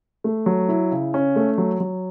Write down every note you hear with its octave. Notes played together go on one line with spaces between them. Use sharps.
A3
F#3
E4
C#3
C#4
A3
F#3
F#3